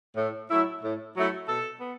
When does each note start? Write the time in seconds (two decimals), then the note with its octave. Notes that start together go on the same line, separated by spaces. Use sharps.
0.16 A2
0.49 F#3 A3 E4
0.82 A2
1.15 F#3 A3 E4
1.47 B2 A4
1.81 B3